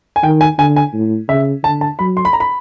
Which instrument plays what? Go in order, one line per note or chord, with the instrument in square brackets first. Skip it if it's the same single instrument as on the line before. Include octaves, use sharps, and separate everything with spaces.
[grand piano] G#5
[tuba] D#3 [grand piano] G5
[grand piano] G#5
[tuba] D3 [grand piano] G#5
[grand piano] G#5
[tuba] A2
[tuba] C#3 [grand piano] E5
[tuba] D3 [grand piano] A5
[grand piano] A5
[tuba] F#3 [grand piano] B5
[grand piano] C6
B5
A#5
B5